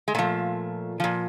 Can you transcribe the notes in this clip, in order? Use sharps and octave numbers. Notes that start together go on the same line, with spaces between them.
G#3
A#2 F3 A3
A#2 F3